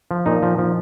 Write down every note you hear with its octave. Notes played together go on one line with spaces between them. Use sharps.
F3
A#2 D#4
F3
F3